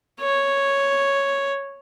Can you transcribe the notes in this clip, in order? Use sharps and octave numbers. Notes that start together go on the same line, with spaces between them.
C#5